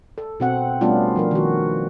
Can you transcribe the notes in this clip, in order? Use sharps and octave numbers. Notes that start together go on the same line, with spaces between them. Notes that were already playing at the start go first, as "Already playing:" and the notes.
A4
B2 C4 F#5
G3 A3 B3 C#4 D4 F4
F3 D4 A#4
D#3 F#4